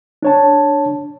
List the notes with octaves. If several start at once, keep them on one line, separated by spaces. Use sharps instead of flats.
D4 C#5 A5